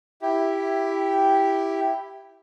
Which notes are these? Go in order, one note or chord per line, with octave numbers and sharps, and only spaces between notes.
E4 G4